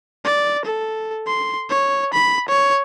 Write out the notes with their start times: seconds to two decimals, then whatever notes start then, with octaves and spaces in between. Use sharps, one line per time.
0.25 D5
0.65 A4
1.27 C6
1.70 C#5
2.14 B5
2.49 C#5